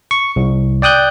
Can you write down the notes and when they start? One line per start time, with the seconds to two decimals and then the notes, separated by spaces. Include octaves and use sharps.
0.11 C#6
0.36 C2
0.82 D5 G5 D#6 F#6 G6